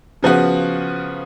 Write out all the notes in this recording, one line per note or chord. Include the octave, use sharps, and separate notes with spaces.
C#3 F3 B3 F#4